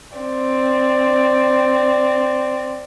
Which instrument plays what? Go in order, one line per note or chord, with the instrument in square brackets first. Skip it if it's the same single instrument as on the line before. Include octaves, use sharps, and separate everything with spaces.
[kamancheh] C4 D5